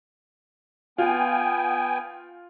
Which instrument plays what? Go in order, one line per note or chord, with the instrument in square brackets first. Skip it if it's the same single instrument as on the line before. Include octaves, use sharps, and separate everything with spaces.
[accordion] B3 G5 G#5 [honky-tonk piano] F4